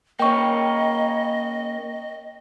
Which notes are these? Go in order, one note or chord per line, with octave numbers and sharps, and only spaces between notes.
A#3 C#4 D#5 G5 C#6